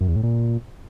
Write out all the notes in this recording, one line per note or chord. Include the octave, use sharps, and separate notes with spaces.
F#2
E2
A2
A#2